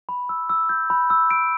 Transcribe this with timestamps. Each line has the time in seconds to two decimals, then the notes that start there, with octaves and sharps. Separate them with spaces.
0.09 B5
0.29 E6
0.50 E6
0.69 G6
0.90 B5
1.10 E6
1.31 D7